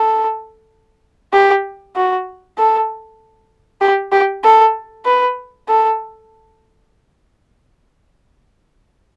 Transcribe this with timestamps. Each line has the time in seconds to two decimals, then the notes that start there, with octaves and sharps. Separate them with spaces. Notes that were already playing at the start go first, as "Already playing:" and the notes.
Already playing: A4
1.33 G4
1.96 F#4
2.58 A4
3.81 G4
4.12 G4
4.44 A4
5.05 B4
5.68 A4